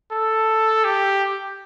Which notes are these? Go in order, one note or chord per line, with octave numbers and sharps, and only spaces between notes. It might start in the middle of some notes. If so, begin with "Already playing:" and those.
A4
G4